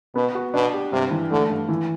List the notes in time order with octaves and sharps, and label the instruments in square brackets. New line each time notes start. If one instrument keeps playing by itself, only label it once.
[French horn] B2 [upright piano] B3
[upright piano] F#4
[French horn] B2 [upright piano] D4
[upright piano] G4
[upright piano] G2 [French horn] C3
[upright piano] E3
[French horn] D3 [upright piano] A3
[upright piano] G2
E3